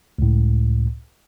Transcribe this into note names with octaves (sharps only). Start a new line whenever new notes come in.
C#2 A2